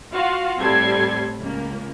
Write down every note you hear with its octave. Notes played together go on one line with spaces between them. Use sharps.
F4 F#4 F5
A2 G3 C4 A4 G#6 C7
C#2 A#3